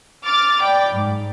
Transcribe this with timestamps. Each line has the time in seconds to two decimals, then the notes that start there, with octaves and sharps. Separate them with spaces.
0.25 D6 F6 A6
0.62 D5 G5 B5 D6
0.93 G#2